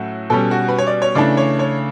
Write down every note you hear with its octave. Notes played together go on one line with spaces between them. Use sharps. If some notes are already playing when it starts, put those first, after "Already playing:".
Already playing: A2 F#3 A3 C#4 F#4
B2 G3 C#4 A4
F#4
B4
C#5
D5
C#5
C#3 E3 A3 D4 D5
C#5
C#5